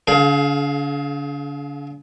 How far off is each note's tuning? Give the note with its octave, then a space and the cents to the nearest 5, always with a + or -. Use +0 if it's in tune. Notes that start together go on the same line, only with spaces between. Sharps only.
D3 -45 G#4 +35 F5 +0